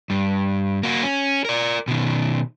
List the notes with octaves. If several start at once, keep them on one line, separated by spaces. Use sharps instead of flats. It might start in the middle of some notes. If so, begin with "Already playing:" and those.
G2
A#3 F#4
C#4
A#4 D5
B2 D#3